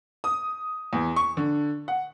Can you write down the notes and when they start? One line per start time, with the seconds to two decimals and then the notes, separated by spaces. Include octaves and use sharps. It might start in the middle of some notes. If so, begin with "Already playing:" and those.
0.24 D#6
0.93 E2
1.16 C#6
1.37 D3
1.88 F#5